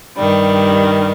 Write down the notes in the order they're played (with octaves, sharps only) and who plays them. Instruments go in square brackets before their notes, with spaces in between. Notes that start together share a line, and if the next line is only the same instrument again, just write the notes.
[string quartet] G2 D#3 G3